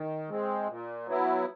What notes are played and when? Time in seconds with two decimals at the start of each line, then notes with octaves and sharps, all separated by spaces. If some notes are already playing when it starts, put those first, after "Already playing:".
Already playing: D#3
0.29 G#3 C4
0.68 A#2
1.07 F#3 B3 E4